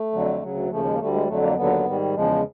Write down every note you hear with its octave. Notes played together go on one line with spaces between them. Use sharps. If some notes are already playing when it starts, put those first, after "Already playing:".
Already playing: A3
F2 D3 F#3
D2 C#3 F#3
D#2 C#3 F3 A3
G#3
A#3
D2 D3 G3 A3
G#3
F2 D3 F#3 A3
A#3
D#2 D3 F#3 B3
G#2 D#3 G3
E2 C#3 F3 G#3